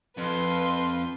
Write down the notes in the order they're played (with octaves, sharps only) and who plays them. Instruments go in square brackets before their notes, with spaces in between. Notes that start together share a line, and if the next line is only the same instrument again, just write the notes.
[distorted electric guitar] F2 [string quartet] B4 C6